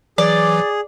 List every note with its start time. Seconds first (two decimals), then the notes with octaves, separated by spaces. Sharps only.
0.18 E3 F#3 G#4 D5